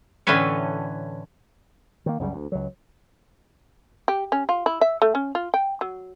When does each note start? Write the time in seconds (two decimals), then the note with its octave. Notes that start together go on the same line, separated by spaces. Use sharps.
0.27 A2 D3 E3 C#4 B4 C#5
2.06 D#3 A#3
2.19 C#2 F#2 C#3 G3
2.33 D2
2.52 C#2 F#3
4.08 G4
4.32 C#4
4.49 F4
4.66 E4
4.81 E5
5.02 A3
5.15 C#4
5.35 F4
5.54 G5
5.81 F#3